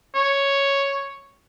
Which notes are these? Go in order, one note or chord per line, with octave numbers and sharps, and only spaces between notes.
C#5